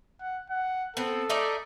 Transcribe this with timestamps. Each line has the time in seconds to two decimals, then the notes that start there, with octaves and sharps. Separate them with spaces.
0.21 F#5
0.50 F#5
0.97 B3 C4 A4
1.29 A3 D#4 D5